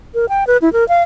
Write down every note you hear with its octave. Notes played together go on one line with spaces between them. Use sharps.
A#4
G5
B4
E4
A#4
F5